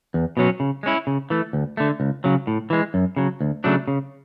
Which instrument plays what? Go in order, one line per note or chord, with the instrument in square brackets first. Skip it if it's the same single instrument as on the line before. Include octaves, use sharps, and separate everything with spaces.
[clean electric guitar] E2
B2 F#3 C#4
C#3
G#3 C#4 E4
C#3
E3 A3
D2
D3 A3
C#2
C#3 F#3
A2
E3 G#3
F#2
C#3 F#3
D2
C#3 F#3 A3 D4
C#3